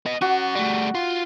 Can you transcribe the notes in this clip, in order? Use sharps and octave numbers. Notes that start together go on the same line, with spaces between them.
B3 D#5
C#4 F#4 F#5
G3 A3
F4